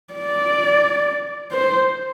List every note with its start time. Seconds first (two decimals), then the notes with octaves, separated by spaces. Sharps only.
0.14 D5
1.52 C5